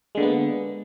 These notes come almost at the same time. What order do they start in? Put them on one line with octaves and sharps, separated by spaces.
G#3 D3 A#3 B3